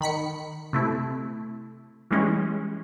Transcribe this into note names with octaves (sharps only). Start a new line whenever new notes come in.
D#3 B5 B6 C#7
C3 A3 E4
E3 G3 G#3 C#4